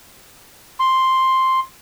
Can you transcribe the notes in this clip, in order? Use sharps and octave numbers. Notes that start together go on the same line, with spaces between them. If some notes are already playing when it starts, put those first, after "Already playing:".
C6